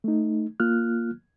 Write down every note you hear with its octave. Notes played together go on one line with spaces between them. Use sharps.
A3 D#4
A#3 F4 F6 F#6